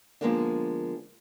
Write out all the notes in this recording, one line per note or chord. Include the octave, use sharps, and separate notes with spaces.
D3 F3 G#3 A#3 B3 D4